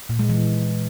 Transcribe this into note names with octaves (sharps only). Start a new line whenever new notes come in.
A#2
G#3
E3